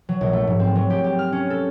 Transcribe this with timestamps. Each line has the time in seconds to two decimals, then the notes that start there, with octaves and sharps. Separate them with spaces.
0.09 F#3
0.21 A#1
0.33 A3
0.47 G#2
0.59 C4
0.75 F#3
0.90 G4
1.04 G4
1.19 F6
1.32 C#4
1.50 A4